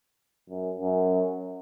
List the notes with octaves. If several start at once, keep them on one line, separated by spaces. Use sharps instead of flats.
F#2
F#2